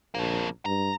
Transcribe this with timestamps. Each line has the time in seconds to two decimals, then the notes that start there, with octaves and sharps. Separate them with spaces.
0.15 A#1 F2 A#3
0.66 G2 A#5